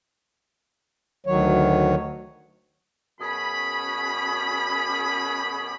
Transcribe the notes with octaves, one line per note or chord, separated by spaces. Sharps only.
D2 D#3 F#3 C#5
F#2 B2 C#4 G#4 B5